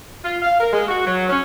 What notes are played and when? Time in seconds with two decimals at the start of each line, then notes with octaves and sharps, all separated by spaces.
0.23 F4
0.42 F5
0.59 A#4
0.73 G#3
0.87 F#4
1.05 F#3
1.28 C#4